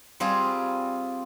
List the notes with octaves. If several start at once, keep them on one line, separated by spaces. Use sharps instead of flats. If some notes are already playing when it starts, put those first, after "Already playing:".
G3 C4 F4 G#4 A#5